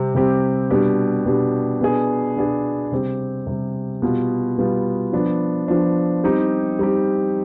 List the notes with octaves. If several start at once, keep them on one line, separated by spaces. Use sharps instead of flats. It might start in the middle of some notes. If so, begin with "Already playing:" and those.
Already playing: C3 G3 C4 G4
C3 G3 C4 G4
B2 G3 D4 G4
B2 G3 D4 G4
B2 B3 D4 G#4
B2 B3 D4 G#4
C3 G3 C4 G4
C3 G3 C4 G4
B2 G3 B3 F4
B2 G3 B3 F4
F3 B3 D4
F3 B3 D4
G3 C4 D#4 G4
G3 C4 D#4 G4